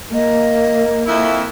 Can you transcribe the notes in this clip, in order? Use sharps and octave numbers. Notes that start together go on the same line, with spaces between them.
A#3 D#5
F2 E4